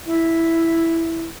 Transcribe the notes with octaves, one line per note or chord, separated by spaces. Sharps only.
E4